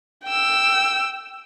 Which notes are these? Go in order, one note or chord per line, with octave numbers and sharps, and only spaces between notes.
G5 E6